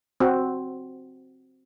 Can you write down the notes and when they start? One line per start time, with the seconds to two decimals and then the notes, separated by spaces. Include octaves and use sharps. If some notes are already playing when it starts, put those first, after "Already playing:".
0.20 C4 F#4